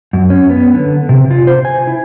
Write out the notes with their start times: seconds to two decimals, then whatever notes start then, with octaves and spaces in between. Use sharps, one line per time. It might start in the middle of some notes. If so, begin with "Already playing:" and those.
0.13 F#2
0.30 C#4
0.50 B3
0.74 D3
1.09 C3
1.31 F4
1.47 C5
1.65 G#5
1.87 E4